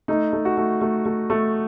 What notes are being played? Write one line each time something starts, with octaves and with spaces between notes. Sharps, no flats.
A3 D#4
A3
F#4
A3
A3
A3
A3